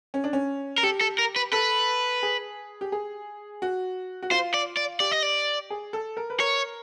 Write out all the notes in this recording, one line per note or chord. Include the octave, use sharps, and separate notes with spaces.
C#4
D4
C#4
A#4
G4 A4
A4
A#4
B4
A4 B4
G#4
G4
G#4
F#4
F#4
F4 C5
D5
D5
G4 D5
D#5
D5
G#4
A4
A#4
B4
A#4 C#5